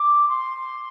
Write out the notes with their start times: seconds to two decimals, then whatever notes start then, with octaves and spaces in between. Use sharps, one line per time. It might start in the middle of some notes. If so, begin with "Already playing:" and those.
Already playing: D6
0.29 C6